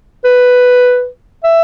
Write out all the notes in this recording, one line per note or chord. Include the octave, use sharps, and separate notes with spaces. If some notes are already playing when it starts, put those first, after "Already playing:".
B4
E5